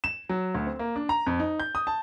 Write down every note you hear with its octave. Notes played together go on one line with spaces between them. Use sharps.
E7
F#3
D2
C4
A#3
D4
A#5
F2
D#4
G6
D#6
A5